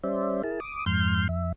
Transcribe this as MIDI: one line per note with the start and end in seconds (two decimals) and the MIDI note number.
0.04 0.42 55
0.04 0.42 61
0.04 0.42 72
0.04 0.42 74
0.04 0.42 76
0.43 0.60 64
0.43 0.60 68
0.43 0.60 70
0.43 0.60 81
0.60 0.85 86
0.60 0.85 87
0.86 1.28 41
0.86 1.28 44
0.86 1.28 84
0.86 1.28 89
0.86 1.28 91
1.29 1.52 41
1.29 1.52 76